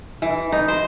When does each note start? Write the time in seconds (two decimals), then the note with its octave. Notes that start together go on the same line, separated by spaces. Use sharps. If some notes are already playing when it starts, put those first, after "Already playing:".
0.22 E3
0.52 D#4
0.68 C5